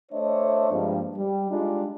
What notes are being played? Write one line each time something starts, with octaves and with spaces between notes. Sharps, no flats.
A3 D4 C5 C#5 D#5 E5
G2 F3 G#3 A#3 C4 D4
G3
G3 G#3 D4 D#4 F4